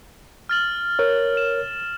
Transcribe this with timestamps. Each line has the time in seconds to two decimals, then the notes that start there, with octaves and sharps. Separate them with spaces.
0.49 F6 A6 F#7
0.99 A#4 C#5
1.37 E7